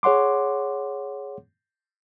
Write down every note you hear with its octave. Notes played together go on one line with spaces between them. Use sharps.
G#4 C#5 F#5 C6 D6